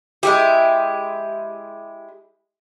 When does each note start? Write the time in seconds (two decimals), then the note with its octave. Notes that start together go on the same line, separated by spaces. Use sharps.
0.23 G#3 E4 G4